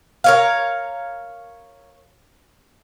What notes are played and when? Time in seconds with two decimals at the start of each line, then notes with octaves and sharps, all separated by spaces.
0.24 A#4 C#5 F5